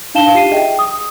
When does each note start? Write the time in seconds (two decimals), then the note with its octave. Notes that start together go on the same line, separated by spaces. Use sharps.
0.15 D4 D#4 F5 A5 E7 G7
0.34 F4 G4 C7 D#7
0.51 G#4 D#5 E5 G5
0.79 D#6